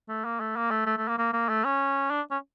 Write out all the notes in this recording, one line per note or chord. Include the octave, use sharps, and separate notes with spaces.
A3
A#3
A3
A#3
A3
A3
A3
A#3
A#3
A#3
A3
C#4
D4
C#4